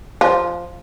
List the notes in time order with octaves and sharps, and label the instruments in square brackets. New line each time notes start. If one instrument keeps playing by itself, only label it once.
[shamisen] F3